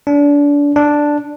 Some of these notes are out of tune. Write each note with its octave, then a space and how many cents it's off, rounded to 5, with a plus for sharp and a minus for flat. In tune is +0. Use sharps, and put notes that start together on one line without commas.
D4 -30
D4 +0